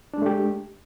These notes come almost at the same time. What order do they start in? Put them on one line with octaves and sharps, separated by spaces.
D4 G#3 A3 G4